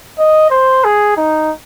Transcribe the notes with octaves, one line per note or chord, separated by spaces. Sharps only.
D#5
C5
G#4
D#4